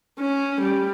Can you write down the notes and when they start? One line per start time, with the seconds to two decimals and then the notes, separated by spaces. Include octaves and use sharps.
0.20 C#4
0.62 G3